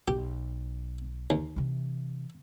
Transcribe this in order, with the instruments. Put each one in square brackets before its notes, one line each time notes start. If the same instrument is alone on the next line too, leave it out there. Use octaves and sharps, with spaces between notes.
[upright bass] B1 [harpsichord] G4
[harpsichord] D#2
[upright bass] C3 E3